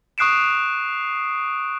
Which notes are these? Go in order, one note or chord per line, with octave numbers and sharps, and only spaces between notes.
C#6 D#6 F#6 C7 D7 E7